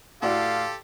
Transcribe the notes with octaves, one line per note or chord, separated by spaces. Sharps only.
A2 F#4 G4 A4 D5 F5 C6